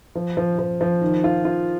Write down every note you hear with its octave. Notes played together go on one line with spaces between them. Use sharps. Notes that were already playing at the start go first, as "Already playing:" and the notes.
F3
F3
F3
F3
D#3
F4
F4